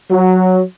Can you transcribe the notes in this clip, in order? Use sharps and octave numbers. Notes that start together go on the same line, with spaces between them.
F#3